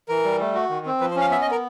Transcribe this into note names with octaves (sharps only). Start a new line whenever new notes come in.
E3 A#4
G3
A3
F#4
D#3
C4
F3 B4
C5
C#4 F5
B3 E5
D#5
B3
A#4